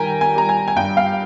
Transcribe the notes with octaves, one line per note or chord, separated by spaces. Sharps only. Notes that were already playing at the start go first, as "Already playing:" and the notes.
Already playing: D#3 G3 G5 G#5 A#5
G#5
G3 A#5
G#5
G#5
G2 G5
F5